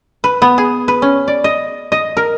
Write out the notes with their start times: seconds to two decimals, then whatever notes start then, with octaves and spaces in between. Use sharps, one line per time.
0.24 B4
0.42 B3
0.58 G#4
0.88 B4
1.02 C#4
1.28 D5
1.44 D#5
1.92 D#5
2.17 A#4